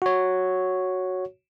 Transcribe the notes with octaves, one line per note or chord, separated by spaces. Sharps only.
F#4 C#5